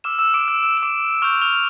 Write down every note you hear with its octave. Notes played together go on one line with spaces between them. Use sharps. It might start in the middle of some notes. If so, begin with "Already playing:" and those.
D6 E6 F6 E7
E6 E7
D6 D7
E6 E7
E6 E7
E7
D6 D7
C#6 F6 G6 F7
F6 F7